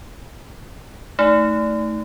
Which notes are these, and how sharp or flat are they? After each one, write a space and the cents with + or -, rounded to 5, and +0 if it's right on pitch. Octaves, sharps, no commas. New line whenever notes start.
A3 +0 D#4 +25